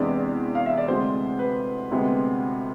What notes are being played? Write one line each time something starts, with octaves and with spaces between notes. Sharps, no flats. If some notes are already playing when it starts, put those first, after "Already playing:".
Already playing: E2 C3 G#3 B3 D4 D5
F5
E5
D5
D2 C3 G#3 C5
B4
D2 C3 G#3 B3